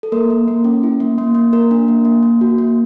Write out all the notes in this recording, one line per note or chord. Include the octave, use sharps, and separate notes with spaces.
A4
A#3 A#4
A#3
A#3
C#4
E4
A#3
A#3
A#3
A#3 A#4
D4
A#3
A#3
A#3
F#4
A#3